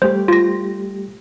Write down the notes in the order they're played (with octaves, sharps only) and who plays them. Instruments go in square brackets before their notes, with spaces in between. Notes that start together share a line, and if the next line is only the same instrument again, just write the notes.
[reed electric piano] G3 A3 G4 [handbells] C5
[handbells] F4 A#6